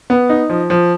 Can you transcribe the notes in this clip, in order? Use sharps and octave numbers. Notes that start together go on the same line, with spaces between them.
B3
D#4
F3
F3